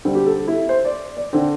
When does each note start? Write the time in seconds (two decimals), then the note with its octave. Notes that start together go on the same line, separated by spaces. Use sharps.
0.05 D3 G3 C4
0.15 G4
0.26 A4
0.48 E4
0.69 C5
0.85 D5
1.17 D5
1.33 D3 C4